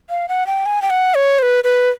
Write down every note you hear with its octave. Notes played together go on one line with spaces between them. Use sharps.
F5
F#5
G5
G#5
G5
F#5
C#5
C5
B4
B4